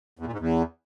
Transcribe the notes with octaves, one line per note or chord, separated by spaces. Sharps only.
E2
A#2
G#2
E2